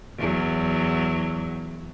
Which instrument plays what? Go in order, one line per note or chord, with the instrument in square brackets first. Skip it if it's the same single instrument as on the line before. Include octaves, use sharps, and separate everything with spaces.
[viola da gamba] E2 F#3